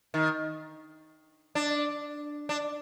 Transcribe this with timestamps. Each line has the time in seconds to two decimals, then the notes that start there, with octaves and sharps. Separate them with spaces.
0.14 D#3
1.55 D4
2.49 D4